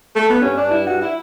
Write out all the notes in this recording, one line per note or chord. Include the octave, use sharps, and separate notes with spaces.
A3
B3
G2 C#4
G2 D4
G3 E4
G2 F#4
E4